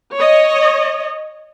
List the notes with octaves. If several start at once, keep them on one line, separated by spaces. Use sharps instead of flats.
C#5 D#5